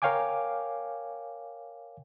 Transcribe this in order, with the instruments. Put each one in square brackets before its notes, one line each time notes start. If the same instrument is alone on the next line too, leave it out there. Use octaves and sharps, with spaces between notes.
[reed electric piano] A#4 C#5 F5 G5 G#5 D6